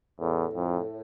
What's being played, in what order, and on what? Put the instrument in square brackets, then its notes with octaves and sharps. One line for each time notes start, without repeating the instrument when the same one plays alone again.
[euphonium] E2 [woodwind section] A2
[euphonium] F2